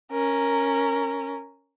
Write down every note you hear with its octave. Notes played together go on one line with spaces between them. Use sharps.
C#4 A#4